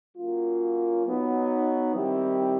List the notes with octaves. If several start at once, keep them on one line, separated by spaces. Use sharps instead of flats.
F#3 A#3 C#4 F4
F#3 B3 D#4
D#3 G3 C4 E4 G4